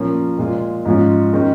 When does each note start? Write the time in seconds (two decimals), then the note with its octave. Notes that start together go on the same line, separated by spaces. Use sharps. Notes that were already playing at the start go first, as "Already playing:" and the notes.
Already playing: A#2 F3 A#3 C#4
0.38 A#2 G#3 F4
0.85 G#2 F3 G#3 C#4 F4
1.33 D#3 G#3 C#4